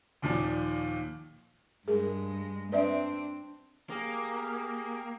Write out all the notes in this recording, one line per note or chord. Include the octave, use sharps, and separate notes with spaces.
D#2 A#2 D#3 F3 D5
G2 G#3 G#4 A#4
C4 D4 B4 D5 E5
A#3 G4 G#4